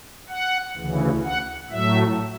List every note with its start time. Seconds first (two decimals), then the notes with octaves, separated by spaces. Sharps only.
0.29 F#5
0.76 D2 C#3 E3
1.24 F#5
1.71 A2 F#3 A3 E5